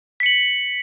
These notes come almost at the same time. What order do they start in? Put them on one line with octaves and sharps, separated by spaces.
B6 C#7 F#7